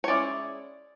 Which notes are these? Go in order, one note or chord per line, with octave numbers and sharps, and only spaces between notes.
C#5
G#3 C#4 E4 D5